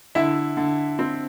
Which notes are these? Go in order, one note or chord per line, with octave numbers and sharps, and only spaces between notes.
D3 E4 E5
D3
C4